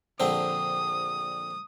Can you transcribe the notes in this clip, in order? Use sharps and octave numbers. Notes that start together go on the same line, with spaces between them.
A#1 D3 C4 D#6